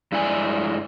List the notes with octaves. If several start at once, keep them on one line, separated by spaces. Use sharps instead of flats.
G2 G#3 E4 D5 G#5